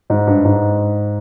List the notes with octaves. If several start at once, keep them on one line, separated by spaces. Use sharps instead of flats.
G#2
G2
G#2